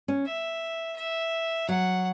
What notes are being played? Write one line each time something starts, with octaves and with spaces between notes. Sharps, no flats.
C#4
E5
E5
F#3 F#5